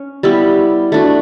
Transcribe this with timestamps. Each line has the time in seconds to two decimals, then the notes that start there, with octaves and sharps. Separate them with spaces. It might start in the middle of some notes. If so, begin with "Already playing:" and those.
Already playing: C#4
0.23 G3 B3 E4 G4
0.92 A3 D4 F#4